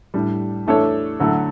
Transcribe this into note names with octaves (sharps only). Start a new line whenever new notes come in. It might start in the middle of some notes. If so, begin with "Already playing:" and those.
A2 G3 D4 G4
E3 A3 D4 A4 C#5
D3 F#3 A3 E4